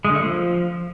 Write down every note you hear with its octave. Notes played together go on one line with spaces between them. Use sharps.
G#3
D3
A3
F3